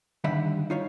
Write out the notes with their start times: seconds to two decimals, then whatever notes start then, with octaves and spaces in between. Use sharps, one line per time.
0.24 G2 D3 D#3 G3 E5 B5
0.70 D#4 F4 C#5